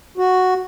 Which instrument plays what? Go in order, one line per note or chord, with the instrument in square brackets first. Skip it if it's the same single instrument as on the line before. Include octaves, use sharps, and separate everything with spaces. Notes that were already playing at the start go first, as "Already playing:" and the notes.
[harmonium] F#4